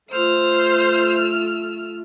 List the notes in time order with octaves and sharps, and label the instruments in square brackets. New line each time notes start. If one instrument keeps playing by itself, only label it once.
[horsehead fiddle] A3 F4 [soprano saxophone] C5 [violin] E6 F6